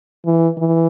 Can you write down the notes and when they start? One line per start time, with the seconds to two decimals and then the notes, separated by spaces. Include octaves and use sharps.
0.25 E3
0.57 E3